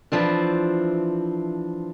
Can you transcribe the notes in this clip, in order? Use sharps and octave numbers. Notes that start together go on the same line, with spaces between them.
E3 F3 C4 D4